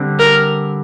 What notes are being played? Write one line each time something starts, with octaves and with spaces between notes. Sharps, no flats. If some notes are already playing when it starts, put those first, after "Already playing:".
Already playing: D3 G3 C4
A#4